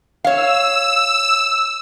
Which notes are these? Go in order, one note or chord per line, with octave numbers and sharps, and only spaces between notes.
C#5 F5 E6